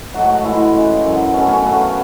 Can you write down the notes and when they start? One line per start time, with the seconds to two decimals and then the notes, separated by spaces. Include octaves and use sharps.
0.14 G#2 F#3 A3 F#4
0.44 A2 E3 G#3 E4
0.74 C#3 G#3
1.03 F#2 D3 F#3
1.33 B2 A3 C#4
1.48 C#4
1.63 C#3 F#3 A3 B3